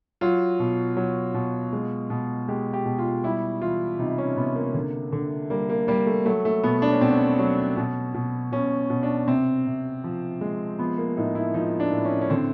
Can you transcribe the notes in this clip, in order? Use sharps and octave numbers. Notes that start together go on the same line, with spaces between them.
F#3 F4
B2
F#3
B2
G#3
B2
G#3 G4
G4
B2
F4
G3 E4
E3 F4
C3 D#4
C#4
C3 B3
A#3
D3
D3
G3 A#3
A#3
G3 A#3
A3
F#3 A3
A3
B2 B3
D4
C#4
B2 C4
C#4
F#3
B2
B2
B2 C#4
B2
D4
C3 C4
C3
F3
G#3
F3 B3
A#3
A2 D#4
E4
F3 D#4
D4
A2
C#4
C#4
D3 C4